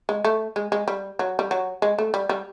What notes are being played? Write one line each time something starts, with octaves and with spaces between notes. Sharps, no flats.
G#3
A3
G#3
G#3
G3
F#3
G3
F#3
G#3
A3
G3
G3